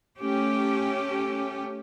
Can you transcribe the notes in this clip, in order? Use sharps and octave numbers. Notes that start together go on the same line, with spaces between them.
A3 C#4 G4